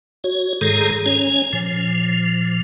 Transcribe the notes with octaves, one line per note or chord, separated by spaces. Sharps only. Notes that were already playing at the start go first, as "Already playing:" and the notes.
F#4 C#5
G#2 D#3 G#3 G#4 A4 A#5
C#4 C#5 G#5
A#2 F3